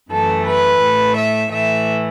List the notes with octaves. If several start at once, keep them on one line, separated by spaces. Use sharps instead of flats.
F#2 E3 A3 A4
B4
A2 A3
E5
A2 E3 A3 E5